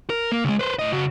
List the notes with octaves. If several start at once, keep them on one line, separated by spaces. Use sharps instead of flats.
A#4
A#3
C#2 G#3
B4 C5
A2 D#5
C#3 F#4